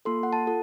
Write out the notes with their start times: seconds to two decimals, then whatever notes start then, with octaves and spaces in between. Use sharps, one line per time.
0.05 A#3 F4 A4 C6
0.23 F#5
0.33 A5
0.47 F4 A4